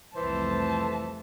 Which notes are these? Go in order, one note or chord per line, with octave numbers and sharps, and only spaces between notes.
C2 F2 E3 A3 C5 A5